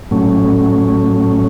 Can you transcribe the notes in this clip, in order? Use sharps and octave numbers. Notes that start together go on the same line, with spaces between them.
A2 F#3 A3 C#4